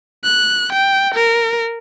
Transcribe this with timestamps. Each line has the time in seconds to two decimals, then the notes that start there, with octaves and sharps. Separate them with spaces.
0.24 F#6
0.73 G5
1.15 A#4